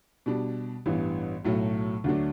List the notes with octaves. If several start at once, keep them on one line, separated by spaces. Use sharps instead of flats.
B2 G3 D4
A1 G2 E3 B3
B1 A2 F#3 A3
D2 D3 F#3 A3 D4